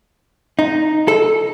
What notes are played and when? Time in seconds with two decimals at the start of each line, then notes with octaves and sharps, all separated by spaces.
0.59 D#4
1.08 A4